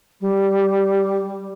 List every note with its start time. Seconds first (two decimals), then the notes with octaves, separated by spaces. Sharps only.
0.21 G3